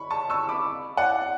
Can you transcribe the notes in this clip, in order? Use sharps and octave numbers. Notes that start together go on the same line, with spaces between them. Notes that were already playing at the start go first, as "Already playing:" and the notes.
Already playing: B5 C#6
A5 C#6
C#6 E6
B5 D6
D5 F#5